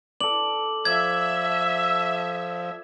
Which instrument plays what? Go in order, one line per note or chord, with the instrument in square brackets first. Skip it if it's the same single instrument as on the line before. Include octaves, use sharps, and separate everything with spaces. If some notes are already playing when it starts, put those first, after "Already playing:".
[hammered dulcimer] A4 D5 [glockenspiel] F#7
[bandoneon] F3 [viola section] E5 [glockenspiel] G#6